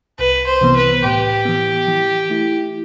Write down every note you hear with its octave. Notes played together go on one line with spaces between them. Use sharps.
C2 B4
C5
C3 E3 B3
B4
A2 G4
E3 B3
E3
A3 E4